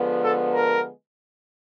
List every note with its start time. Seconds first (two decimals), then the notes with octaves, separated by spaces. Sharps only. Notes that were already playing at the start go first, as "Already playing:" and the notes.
Already playing: D3 F3 G#3 B3
0.24 A4
0.54 A#4